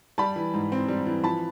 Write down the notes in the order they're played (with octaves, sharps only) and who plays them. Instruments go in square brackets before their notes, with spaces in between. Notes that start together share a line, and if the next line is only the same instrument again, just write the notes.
[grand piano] G3 A5 B5
E3
G#2
C4
G3
E3
F3 A5 B5